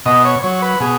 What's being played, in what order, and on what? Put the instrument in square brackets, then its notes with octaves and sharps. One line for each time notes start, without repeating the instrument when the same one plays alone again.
[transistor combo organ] B2 D#5
C#5
F#3 C#5
B4
B2 G#4